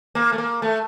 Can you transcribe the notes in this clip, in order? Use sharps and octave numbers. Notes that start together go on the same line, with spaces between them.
A#3
A3
A#3
A3